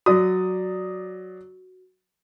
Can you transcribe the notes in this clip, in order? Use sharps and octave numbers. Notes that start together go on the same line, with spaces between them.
F#3 F#4 D5 D#6